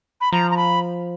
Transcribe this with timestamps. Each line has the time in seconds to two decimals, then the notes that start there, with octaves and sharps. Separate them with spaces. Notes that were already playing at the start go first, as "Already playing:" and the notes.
0.21 B5
0.32 F3 A#5
0.51 A#5
0.57 B5